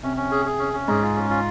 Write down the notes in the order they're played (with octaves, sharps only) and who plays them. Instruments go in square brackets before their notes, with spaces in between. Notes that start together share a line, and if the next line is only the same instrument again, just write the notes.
[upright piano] C3 [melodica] C#4
[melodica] C#4
G#4
G#4
C#4
C#4
[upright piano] G#2 [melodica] G#4
[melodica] F4
C#4
F4